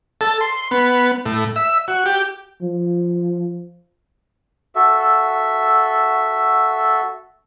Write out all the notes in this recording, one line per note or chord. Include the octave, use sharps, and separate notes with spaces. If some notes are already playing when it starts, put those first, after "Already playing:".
A4
C6
B3
A2
E5
F#4
G4
F3
F#4 A4 E5